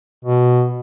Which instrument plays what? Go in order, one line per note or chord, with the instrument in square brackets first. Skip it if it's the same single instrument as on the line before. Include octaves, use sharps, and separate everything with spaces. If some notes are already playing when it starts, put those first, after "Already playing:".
[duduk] B2